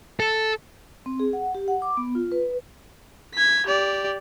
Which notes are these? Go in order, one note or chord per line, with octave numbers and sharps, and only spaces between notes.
A4
C4
G#4
F#5
G4
F#5
D6
B3
F4
B4
G#6 B6
G4 D5